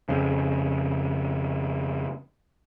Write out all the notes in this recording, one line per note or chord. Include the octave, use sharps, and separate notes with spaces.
F2 C#3